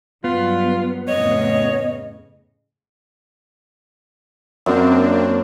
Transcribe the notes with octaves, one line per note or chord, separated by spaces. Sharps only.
G2 F#3 B3 F4
F2 A2 C#3 C#5 D#5
F#2 A#3 C4 D4